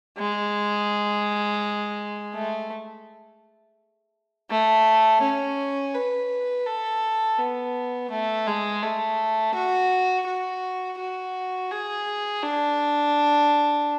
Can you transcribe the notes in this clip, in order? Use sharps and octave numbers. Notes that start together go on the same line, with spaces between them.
G#3
A3
A3
C#4
B4
A4
B3
A3
G#3
A3
F#4
F#4
F#4
G#4
D4